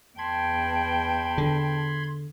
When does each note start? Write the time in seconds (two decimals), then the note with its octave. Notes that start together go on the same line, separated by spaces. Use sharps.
0.18 E2 G5 A5 B5 C6 G#6
1.38 D3